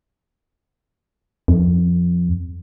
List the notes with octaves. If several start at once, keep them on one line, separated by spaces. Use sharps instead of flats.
F2